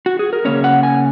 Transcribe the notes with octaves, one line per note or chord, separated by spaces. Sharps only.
F#4
G#4
A#4
C#3 A#3 C#4 C#5
F#5
G#5